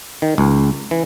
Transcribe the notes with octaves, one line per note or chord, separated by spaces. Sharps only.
D#3
C#2
E3